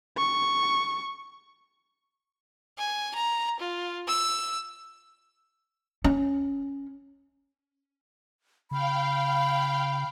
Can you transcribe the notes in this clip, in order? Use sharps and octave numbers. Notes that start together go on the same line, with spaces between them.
C#6
G#5
A#5
F4
E6
C#4
C#3 F5 G5 B5